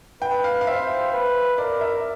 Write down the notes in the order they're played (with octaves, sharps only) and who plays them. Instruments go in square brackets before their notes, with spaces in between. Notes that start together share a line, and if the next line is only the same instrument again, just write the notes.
[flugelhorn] B4 [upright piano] G5
[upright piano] F5
F5
[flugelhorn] C5 [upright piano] E5
[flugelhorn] B4
[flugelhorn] A#4 [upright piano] D5
[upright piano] E5